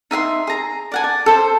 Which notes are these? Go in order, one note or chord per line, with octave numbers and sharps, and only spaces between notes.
D#4 E5 F#5 C6
G#4 A#5
D5 F#5 G#5
D5
A4 C5